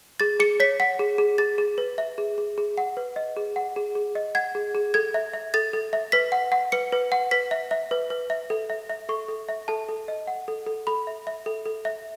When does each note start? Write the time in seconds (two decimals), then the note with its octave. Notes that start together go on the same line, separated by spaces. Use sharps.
0.20 G#4 A6
0.40 G#4 C#7
0.60 C#5 B6
0.80 F#5 B6
0.99 G#4
1.18 G#4
1.38 G#4 A6
1.58 G#4
1.78 B4
1.98 E5
2.18 G#4
2.38 G#4
2.58 G#4
2.78 F#5
2.97 B4
3.16 D#5
3.37 G#4
3.56 F#5
3.76 G#4
3.95 G#4
4.15 D#5
4.35 F#5 G#6
4.55 G#4
4.75 G#4
4.94 A4 G#6
5.14 E5
5.33 E5
5.54 A4 A6
5.73 A4
5.93 E5
6.12 B4 B6
6.32 F#5
6.52 F#5
6.72 B4 C#7
6.92 B4
7.12 F#5
7.31 B4 B6
7.51 E5
7.71 E5
7.91 B4
8.10 B4
8.30 E5
8.50 A4
8.70 E5
8.90 E5
9.09 A4 C#6
9.28 A4
9.49 E5
9.68 A4 A5
9.88 A4
10.08 D#5
10.27 F#5
10.48 A4
10.67 A4
10.87 A4 B5
11.07 E5
11.27 E5
11.46 A4
11.66 A4
11.85 E5